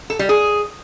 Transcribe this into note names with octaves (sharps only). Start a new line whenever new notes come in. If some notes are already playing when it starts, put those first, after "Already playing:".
A4
G3
G#4